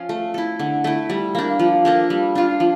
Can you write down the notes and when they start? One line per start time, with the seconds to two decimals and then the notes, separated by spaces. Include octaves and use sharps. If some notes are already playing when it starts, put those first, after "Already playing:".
Already playing: F3 C#4 F4
0.09 A3
0.34 E4 A4
0.59 D3
0.84 A3 E4
1.10 G3
1.35 A#3 D4
1.59 F3
1.85 A#3 D4 A4
2.10 G3
2.35 D4 F4
2.60 F3